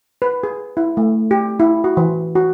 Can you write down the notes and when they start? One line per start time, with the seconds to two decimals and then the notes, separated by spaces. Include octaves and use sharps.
0.22 B4
0.43 G#4
0.77 E4
0.97 A3
1.31 G4
1.60 E4
1.84 F#4
1.97 E3
2.35 F#4